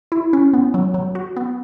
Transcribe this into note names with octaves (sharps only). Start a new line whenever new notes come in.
E4
C#4
B3
F#3
F#3
F#4
B3